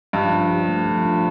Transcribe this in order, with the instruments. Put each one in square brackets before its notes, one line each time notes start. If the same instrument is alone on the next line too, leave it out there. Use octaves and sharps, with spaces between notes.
[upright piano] G2 [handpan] F3
[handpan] D4
G4
A3
F3
D4